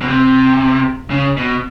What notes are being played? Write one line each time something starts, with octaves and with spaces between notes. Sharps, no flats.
B2
C3
C#3
B2